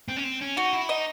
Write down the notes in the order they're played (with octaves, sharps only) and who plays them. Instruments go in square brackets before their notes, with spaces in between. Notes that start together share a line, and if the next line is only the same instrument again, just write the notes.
[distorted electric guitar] C4
C#4
C4
C#4
[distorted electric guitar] D#4 [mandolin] F#4
[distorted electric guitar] E4
[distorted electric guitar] D#4 [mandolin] D#5